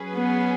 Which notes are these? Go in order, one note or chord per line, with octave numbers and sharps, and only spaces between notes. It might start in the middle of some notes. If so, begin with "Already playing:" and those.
Already playing: F#3 C#4 G#4 B4
B3